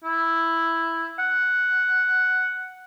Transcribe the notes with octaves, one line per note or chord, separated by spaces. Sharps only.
E4
F#5